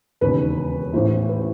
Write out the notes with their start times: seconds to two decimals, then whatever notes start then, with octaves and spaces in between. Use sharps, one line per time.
0.21 E1 D#2 C#3 B4
0.93 A1 A2 E3 C5
1.29 B4